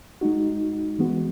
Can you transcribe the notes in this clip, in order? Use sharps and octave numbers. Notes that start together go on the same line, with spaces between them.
G#3 D#4 F#4
E3 G#3 B3 F#4